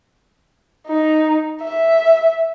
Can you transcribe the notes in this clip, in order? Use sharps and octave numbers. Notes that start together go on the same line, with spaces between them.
D#4
E5